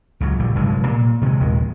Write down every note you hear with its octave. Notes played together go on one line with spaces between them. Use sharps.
C#2 C#3 F#3
A#1 D3 G3
F1 B1 G2 G#3
A#2
C3 D#3 F#3 G#3
A#1 D#2 D#3 G#3